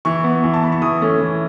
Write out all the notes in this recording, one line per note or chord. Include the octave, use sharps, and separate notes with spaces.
E3 C#6
B3
E3
A5
B3 B5
C#6
E3 D#6
A3 C#4
E3